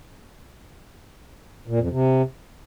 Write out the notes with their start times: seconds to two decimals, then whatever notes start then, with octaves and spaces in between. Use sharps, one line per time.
1.68 A#2
1.79 F2
1.91 C3